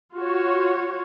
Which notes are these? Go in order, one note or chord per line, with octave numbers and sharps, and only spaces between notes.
F4 F#4 C#5